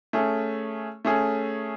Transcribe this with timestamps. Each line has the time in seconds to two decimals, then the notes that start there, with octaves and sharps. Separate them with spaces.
0.13 A3 C#4 G#4
1.05 A3 C#4 G#4